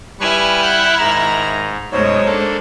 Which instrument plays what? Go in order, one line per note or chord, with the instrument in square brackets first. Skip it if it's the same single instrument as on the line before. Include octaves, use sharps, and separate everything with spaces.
[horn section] G3 [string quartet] E4 F6 [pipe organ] B4 G#5 C#6
[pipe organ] F#5 F#6 G6
[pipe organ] G#2 [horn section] D#3 D#5 A#5
[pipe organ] F#2 B2 [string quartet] G#3 C5 [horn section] D#4 C#5
[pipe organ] A#3 D4 A4